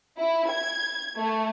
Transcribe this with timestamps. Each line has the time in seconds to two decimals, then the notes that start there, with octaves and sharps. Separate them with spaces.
0.19 E4
0.50 G#6
1.17 A3